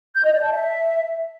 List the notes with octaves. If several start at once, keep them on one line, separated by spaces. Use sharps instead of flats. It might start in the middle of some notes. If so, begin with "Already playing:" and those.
G6
D#5
D5
A5
E5